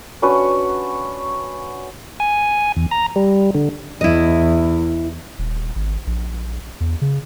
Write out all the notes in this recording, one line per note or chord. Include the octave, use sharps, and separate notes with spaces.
C#4 D4 F#4 B4
G#5
E2
A#5
G3
D3
E2 E4 D#5
D#1
G#1
A#1
E2
C#3